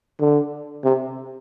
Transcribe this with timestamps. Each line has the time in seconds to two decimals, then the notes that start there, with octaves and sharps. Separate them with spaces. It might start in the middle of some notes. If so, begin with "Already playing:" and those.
0.20 D3
0.84 C3